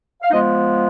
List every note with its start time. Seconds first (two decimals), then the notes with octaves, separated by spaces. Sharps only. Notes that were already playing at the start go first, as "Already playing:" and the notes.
0.22 F5
0.31 F3 G#3 B3 D#4 D#5